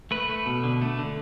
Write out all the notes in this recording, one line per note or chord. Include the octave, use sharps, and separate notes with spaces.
A3 B4
A3
B2
D3
A3
D3